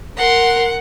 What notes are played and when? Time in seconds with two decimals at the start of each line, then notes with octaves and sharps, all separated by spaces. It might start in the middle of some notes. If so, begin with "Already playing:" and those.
0.17 A#4 F#5 C6